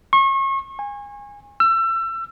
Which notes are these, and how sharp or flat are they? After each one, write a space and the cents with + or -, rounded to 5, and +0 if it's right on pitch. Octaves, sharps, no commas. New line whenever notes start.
C#6 -35
G#5 -25
E6 +30